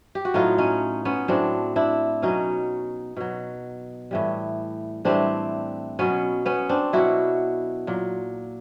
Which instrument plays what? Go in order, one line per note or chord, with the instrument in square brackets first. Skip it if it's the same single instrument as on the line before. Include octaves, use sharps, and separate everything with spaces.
[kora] G4
F#4
A2 F#3 D#4 F4
C#4 D#4
B3 C#4
A2 F#3 C4 D4
D4 E4
B2 F#3 C#4 D#4
B2 F#3
A2 E3 G3
A2 E3 G3 C4 D4
B2 F#3 B3 C#4
B3 C#4
C4 D4
B2 F#3 E4 F#4
A#2 F#3